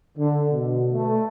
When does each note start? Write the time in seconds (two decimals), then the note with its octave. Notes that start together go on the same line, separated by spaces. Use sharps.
0.18 D3
0.52 B2
0.93 A3